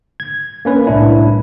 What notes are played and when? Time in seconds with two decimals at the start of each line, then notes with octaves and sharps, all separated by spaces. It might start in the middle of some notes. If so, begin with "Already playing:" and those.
0.20 G#6
0.65 A#3 C#4 B4
0.87 C2 A2 D4 E4